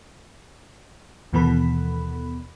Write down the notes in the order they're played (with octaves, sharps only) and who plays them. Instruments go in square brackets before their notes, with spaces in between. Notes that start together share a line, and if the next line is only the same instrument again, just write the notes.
[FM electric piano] D#2 B2 E3 B3 A4 B5